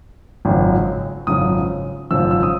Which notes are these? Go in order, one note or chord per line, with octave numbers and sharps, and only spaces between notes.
G#1 F#2 C#3 F3
G#1 F#2 C#3 F3 D#6
G#1 F#2 C#3 F3 E6
E6
D#6